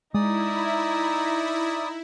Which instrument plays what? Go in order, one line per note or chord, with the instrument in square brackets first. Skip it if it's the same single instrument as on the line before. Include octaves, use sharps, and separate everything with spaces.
[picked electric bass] G#3 [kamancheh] D#4 A#5 [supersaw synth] E4 [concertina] D5 D#6